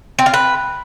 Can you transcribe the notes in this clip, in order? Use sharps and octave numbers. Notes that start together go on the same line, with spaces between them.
C4
F4
B4